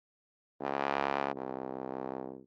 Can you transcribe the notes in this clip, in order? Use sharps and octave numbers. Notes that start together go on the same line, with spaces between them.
C#2
C2